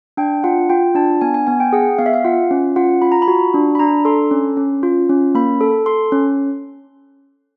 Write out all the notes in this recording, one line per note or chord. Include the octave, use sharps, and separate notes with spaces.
D4 G5
F4 F#5
F4 G5
D4 A5
B3 G#5
G#5
B3 G#5
G5
G#4 F#5
B3 F5
E5
F5
F4 F#5
C#4
F4 F#5
F4 B5
A#5
B5
F#4
D4
B5
D4 A#5
A4 C6
C#4
C#4
F4
C#4
A#3 B5
A4
A4 C6
C#4